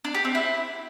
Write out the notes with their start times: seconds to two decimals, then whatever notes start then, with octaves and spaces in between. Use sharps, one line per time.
0.04 D4
0.15 G4
0.25 C4
0.35 E4